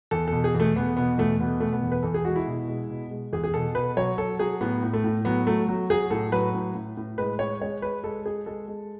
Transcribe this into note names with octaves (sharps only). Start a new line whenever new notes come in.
E2 A4
B2 A4
G#4
E2 A3
E2 B3
B2 B3
E2 A3
B2 B3
B2 A3
B3
E2
B4
E2 A4
G#4
G#3 F#4
E4
B2
G#3
B2
G#3
E2 G#4
G#4
B2 A4
B2 B4
F#3 C#5
F#3 A4
F#3 G#4
A2 B3
A2
A3
A2
F#3 B3
F#3 A3
F#3
F#3 G#4
A2 A4
F#3 B4
A2
A2
A2
G#3 B4
G#3 C#5
G#3 C#5
G#3 B4
G#3 A4
G#3 G#4
G#3 A4
G#3